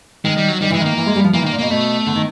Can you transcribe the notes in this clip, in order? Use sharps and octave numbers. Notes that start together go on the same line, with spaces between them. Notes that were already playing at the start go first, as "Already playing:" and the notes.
D#3 G#3
G3
F#3
D#3 G3
E3 G#3
D#3
A#3
E3
G#3
G3
F3
E3 A#3
D#3
A#3
A#2
B2 A#3
B2 A3
D3
D#3